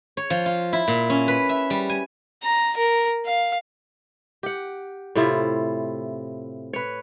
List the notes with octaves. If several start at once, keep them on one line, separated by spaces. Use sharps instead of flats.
C#5
F3
F4
E4
A#2
C#4
B4
E5
G3
G#5
A#5
A#4
F5
G4 F#5
A2 C3 E4 F4
B4 C#5